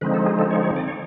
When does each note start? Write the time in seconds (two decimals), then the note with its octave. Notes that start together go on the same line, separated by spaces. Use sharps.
0.01 D3 F3 G#3 C4 D#4 B4
0.14 A4
0.26 G#4
0.39 A4
0.51 C#5
0.63 C#5
0.76 D5
0.88 C#5